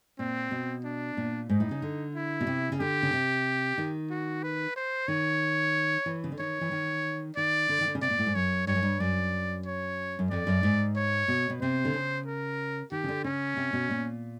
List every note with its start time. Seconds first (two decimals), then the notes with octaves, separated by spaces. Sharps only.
0.19 A#2 C4
0.51 B2
0.84 D4
1.17 A#2
1.49 G#2 D#4
1.60 A2
1.71 C#3
1.82 D3
2.15 E4
2.41 B2
2.47 C3
2.72 C#3
2.80 D3 G4
3.03 C#3
3.13 C3
3.78 D#3
4.11 F#4
4.43 B4
4.76 C5
5.08 D#3 C#5
6.06 E3
6.24 C#3
6.32 D3
6.39 D#3 C#5
6.61 E3
6.71 D#3
7.37 D#3 D5
7.69 D3
7.81 D#3
7.88 D3
7.95 C#3
8.02 C3 D5
8.10 A#2
8.19 A2
8.27 G#2
8.35 F#2 C#5
8.67 G2 C#5
8.75 F#2
8.83 G2
9.00 F#2 D5
9.66 C#5
10.19 F#2
10.31 F2 D5
10.47 F#2
10.63 G#2
10.96 C#5
11.28 B2
11.50 B2
11.62 C3 C5
11.85 D3
11.94 C#3
12.27 A#4
12.92 D#3 G4
13.04 C#3
13.09 D3
13.24 C#3 C#4
13.57 C3
13.73 B2
13.91 A#2